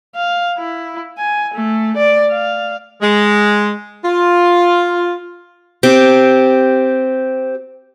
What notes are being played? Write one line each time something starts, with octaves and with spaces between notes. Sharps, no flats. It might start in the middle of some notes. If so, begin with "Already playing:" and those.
F5
E4
G#5
A3
D5
F5
G#3
F4
C4 G4